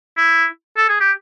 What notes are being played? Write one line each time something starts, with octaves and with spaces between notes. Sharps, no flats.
E4
A4
G#4
G4